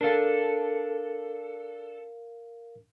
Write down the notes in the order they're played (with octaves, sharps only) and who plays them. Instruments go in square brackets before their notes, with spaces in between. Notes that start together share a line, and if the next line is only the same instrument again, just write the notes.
[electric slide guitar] D4 A4 [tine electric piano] A#4 F5